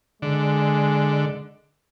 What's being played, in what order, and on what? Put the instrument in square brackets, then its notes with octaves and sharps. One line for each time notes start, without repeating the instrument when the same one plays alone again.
[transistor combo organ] D3 [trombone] G#3